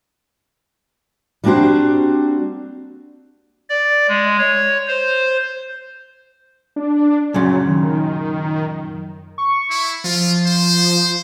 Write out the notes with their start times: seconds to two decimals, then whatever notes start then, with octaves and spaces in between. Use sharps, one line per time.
1.44 G3 A#3 C4 D4 F#4 C5
3.70 D5
4.08 G#3
4.38 C#5
4.87 C5
6.76 D4
7.34 F#2 A#2 C#3 F#3
7.67 D#3
9.38 C#6
9.70 E4
10.04 F3 F4
10.46 C5